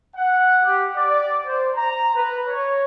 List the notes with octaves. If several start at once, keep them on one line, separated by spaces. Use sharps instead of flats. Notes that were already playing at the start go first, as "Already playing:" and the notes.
F#5
G4
D5
C5
A#5
B4
C#5